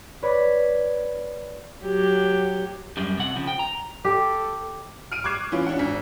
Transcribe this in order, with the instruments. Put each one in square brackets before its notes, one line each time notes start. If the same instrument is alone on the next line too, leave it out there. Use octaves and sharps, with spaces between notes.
[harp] B4 C#5 D5
[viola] F#3 G4
[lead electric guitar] F#2 G3
C3 F#5
C#3 F3
G5
A#5
[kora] G4 [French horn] A4
[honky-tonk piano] F6 D7 D#7
C#6 D6 F#6 G#6 C7 E7
E3 C#4 F4
C#4 D4 F#5
G#1 B6